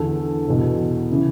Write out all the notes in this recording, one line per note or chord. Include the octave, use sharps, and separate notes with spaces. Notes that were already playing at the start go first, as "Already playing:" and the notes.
Already playing: E2 D3 A4
E2 B2
C#3 E3